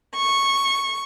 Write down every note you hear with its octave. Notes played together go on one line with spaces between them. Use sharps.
C#6